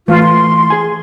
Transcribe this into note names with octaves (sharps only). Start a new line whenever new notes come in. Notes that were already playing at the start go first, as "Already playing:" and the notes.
E3 A3 F4
C6
G#4 G#5